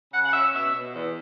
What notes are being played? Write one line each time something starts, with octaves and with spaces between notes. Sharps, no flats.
C#3 F#5
F#5
C#4 E5
B2 E5
B2
E2